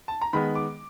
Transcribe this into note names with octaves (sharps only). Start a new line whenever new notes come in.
A5
A#5
D#3 G#3 B3 B5
D6